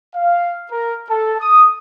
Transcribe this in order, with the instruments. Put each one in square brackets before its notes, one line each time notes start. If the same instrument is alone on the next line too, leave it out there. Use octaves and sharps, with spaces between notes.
[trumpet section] F5
A#4
A4
D#6